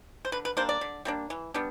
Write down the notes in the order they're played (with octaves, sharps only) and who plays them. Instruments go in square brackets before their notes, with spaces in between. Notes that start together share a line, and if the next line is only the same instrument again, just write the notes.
[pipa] C5
D3 B4
B4
G3 A#3 D4 C5
D5
D3
G3 A#3 D4
E3
G3 B3 D4